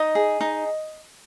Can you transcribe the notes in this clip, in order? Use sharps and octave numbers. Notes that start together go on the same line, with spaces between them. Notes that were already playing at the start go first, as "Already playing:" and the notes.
Already playing: D#4 D#5 D#6
G#4
D#4